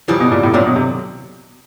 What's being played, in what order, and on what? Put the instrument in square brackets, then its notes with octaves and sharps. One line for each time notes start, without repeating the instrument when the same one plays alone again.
[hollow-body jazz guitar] C#2 C#3 E3 G3 [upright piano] F3
[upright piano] B2
A#2
A2
[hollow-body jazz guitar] D#2 D3 F#3 [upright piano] A#2
[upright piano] B2
C3